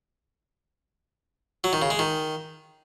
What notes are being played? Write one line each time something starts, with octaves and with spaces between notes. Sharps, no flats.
F#3
D#3
C#3
G#3
D#3